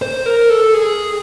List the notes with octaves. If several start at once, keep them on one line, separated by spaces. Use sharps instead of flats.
C5
A#4
A4
G#4